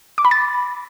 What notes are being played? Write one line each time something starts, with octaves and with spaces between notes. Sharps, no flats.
D6
B5
A6